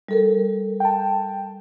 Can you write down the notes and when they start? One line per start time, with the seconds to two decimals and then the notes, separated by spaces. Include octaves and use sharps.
0.09 G3 A4 A#4
0.80 G5 A5